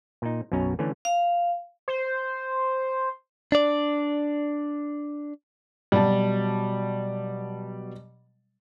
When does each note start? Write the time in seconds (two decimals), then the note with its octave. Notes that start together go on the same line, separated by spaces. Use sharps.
0.22 A#2 D#4
0.52 B1 F#2 B2 C#4 A#5
0.79 D3 E3 A3 C#4
1.05 F5
1.88 C5
3.52 D4 D5
5.92 B2 F#3 G3 A5